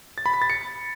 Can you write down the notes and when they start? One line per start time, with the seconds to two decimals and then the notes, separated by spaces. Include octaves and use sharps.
0.18 A6
0.26 B5
0.34 B6
0.42 A6
0.50 C#7